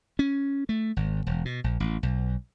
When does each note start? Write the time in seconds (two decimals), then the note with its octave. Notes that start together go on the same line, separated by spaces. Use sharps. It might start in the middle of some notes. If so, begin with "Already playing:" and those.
0.19 C#4
0.69 A3
0.96 G#1
1.27 E1
1.45 B2
1.64 A#1
1.80 A1
2.03 B1